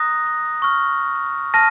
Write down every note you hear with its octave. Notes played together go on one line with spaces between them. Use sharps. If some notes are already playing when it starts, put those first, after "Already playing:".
Already playing: A#5 D#6 F#6 A#6
C#6 F6
A5 F6 A#6